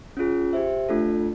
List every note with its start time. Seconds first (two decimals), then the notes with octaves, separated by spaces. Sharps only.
0.17 C#4 F4 G#4
0.53 G4 C5 E5
0.89 A3 D4 F4 A4